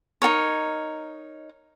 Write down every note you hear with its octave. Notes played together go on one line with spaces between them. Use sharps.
D#4 F#4 A#4 C#5